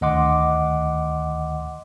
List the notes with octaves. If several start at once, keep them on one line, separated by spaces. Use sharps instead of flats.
D2 D#3 D#5 F#5 C6 D6